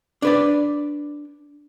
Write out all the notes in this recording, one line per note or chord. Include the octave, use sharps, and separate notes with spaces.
D4 B4 D5